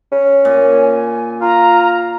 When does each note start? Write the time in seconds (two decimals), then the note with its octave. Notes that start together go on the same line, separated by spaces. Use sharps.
0.12 C#4
0.45 A#2 G#5
1.41 F4 A#5